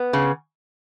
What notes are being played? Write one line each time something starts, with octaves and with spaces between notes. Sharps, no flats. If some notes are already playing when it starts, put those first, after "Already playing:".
Already playing: B3
C#3